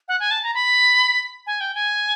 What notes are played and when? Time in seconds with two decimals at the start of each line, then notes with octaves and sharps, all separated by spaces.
0.08 F#5
0.20 G#5
0.31 A5
0.43 A#5
0.54 B5
1.47 G#5
1.60 G5
1.75 G#5